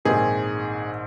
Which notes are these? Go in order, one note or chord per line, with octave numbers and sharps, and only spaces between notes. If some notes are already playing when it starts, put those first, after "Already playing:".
A#1 G#2 D#3 G#3 C4 G#4